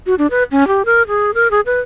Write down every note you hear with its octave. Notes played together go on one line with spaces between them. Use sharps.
F#4
D4
B4
C#4
G4
A#4
G#4
A#4
G#4
B4